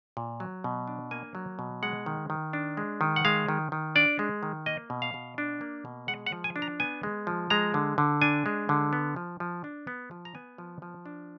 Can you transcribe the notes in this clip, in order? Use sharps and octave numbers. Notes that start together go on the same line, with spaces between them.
A#2
F#3
B2
D4
A#3 G#5
F#3
B2
G#3 F#5
D#3
D#3
D4
G#3
D#3
F#5
G#3 F5
D#3
D#3
D4 D5
G#3
D#3
A#3 D#5
B2
F5
B2
D4
A#3
B2
G#3 F#5
F#5
F3
G#5
D4
A#5
B3 G#5
G#3
F3
G#3 A#5
D3
D3
D4 G#5
G#3
D3
B3
F3
F3
D4
B3
F3
A#5
B3 G#5
F3
F3
D4